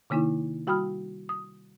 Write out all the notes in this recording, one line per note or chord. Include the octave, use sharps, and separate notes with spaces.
C3 D#3 A#3 D#4 E4
G3 F#4 G5 B5 D#6 F6
D#6